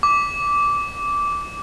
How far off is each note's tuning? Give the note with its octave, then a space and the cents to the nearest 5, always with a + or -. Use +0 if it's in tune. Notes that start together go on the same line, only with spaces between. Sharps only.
D6 -15